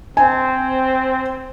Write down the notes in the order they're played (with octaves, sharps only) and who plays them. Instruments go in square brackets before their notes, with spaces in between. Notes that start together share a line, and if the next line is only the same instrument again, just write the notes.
[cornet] C4 [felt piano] G#5